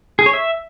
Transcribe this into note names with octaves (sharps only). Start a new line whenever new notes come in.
G#4
C#5
E5